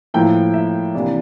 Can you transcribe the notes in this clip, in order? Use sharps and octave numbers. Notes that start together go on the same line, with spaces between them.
A2 F3 A#3 E4 G5
E5
C3 E3 A#3 D4 D5